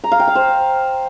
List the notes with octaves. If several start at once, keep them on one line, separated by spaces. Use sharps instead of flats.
A#5
F5
G5
F5
C5